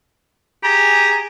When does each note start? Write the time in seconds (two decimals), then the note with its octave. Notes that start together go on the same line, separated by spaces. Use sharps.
0.64 G4 G#4 G#5 A#5